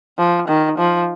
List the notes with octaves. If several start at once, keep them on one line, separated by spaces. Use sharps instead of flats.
F3
D#3
F3